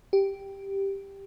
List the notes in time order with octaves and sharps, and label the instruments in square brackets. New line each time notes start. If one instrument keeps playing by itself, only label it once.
[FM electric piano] G4